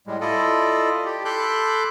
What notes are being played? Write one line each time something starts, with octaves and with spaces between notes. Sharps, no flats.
A2 G3 G#3
E4 F4 A4 D5 D#5
G4
A4 B5 C6 D6 F#6 G6